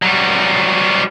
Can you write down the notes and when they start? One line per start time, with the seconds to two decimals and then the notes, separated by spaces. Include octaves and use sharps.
0.02 F#3 G3